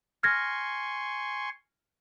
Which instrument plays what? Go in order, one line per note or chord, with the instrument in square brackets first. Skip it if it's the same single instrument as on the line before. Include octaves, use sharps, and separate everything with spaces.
[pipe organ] G#5 C6 C#6 [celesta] F6 G#6 A#6